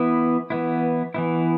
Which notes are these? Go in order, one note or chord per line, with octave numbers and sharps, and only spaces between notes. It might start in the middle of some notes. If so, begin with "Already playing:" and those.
Already playing: E3 B3 E4
E3 B3 E4
E3 B3 E4